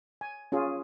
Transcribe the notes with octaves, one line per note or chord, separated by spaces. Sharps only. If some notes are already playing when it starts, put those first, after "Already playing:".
G#5
C#4 F4 G#4